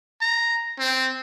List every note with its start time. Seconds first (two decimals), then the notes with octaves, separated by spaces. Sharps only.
0.21 A#5
0.79 C4